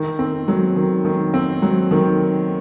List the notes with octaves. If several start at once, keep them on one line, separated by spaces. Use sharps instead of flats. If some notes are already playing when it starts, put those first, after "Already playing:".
Already playing: D#3
C4
F#3
D#3
D#3
C4
F#3
D#3